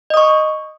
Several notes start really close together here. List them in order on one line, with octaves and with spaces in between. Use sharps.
D#5 D#6 C#6